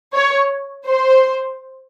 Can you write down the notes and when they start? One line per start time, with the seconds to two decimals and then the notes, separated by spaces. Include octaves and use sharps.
0.13 C#5
0.87 C5